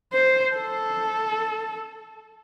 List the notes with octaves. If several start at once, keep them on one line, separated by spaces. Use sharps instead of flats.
C5
A4